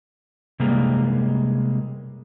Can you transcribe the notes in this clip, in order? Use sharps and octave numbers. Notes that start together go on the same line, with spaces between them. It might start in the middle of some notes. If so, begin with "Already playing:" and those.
C3 G3 G#3 A#3